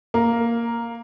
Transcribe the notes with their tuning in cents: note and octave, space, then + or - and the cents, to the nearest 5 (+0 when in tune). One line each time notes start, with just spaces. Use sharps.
A#3 +0 A#5 +5